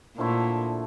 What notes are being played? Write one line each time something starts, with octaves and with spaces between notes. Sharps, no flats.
A#2 D3 F3 A3 E4